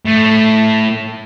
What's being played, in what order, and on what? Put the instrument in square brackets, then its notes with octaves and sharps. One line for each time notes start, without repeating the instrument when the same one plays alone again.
[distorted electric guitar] A2